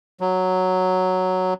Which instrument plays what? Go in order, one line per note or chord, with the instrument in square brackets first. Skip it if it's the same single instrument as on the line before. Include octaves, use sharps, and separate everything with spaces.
[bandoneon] F#3